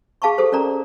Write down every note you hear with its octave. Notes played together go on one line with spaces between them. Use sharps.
G#4 F5 A5 B5 C#6
G4 A4 C5
C#4 A#4 D5 A#5